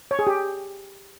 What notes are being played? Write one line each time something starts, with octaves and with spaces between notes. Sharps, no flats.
C#5
G#4
G4